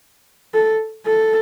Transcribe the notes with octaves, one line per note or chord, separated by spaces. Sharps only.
A4
A4